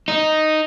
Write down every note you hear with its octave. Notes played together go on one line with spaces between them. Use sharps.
D#4